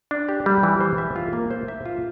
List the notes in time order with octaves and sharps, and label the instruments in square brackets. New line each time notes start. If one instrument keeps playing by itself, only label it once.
[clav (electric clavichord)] D4
G4
G3
E3
C5
E5
F4
A#3
C5
E5
F4